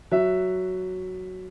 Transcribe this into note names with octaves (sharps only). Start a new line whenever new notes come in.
F#3 E5